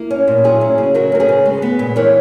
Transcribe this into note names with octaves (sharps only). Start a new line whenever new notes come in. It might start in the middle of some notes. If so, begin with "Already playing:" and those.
Already playing: A#3 E4
C#4
A#2
F#3 E4 G#4
C#4
C#3
F#3 F#4 A#4
C#4 A#4
G#4 B4
C#3
G#3
B3
A#2
E3 A#4 C#5